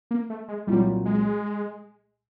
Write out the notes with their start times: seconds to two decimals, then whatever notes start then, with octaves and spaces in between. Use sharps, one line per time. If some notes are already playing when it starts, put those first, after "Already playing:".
0.11 A#3
0.30 A3
0.48 G#3
0.67 C2 A#2 F#3 G3
1.05 G#3